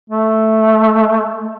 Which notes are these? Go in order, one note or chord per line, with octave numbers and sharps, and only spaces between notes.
A3